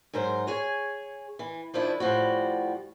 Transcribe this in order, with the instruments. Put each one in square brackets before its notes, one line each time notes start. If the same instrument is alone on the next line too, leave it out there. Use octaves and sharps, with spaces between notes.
[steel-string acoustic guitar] G#2 F#3 A#4 C5
G#4 C#5 G#5
E3
D#3 F3 D4 E4
A2 F3 G3 F#4